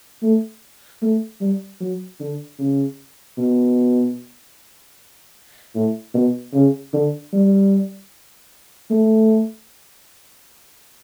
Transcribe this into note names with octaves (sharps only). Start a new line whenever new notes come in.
A3
A3
G3
F#3
D3
C#3
B2
A2
B2
C#3
D3
G3
A3